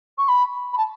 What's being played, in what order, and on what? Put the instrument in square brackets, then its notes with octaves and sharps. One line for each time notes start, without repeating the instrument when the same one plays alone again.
[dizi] C#6
B5
B5
A5